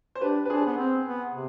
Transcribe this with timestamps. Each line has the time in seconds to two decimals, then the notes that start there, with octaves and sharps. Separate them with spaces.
0.15 C5
0.21 D4 G4 B4
0.46 B4
0.50 D4 G#4 C5
0.66 B3
0.77 C4
1.05 B3
1.33 C3